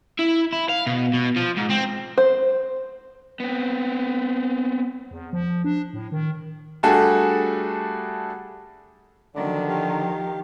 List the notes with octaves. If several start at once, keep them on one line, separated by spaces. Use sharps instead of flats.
E4
E4
F5
B2
B2
F3
G#2
C4
C5
B3 C4
E2
F3
D4
A2
D#3
G3 A3 D4 F#4 G#4 A4
D3 D#3 F3 F#3 D5
G4 F5